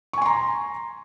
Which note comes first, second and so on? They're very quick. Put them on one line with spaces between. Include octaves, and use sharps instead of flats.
C#6 G#5 C6 A#5